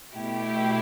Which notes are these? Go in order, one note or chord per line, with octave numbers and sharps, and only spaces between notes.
B2 A3 E4 G4